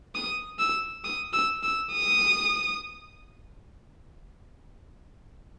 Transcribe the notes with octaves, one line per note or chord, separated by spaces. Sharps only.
D#6
E6
D#6
E6
E6
D#6